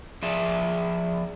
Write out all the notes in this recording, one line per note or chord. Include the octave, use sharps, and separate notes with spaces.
F3 G#4 D5 E5